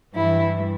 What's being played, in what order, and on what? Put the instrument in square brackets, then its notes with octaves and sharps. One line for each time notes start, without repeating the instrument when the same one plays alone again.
[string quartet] G2 E3 G3 E4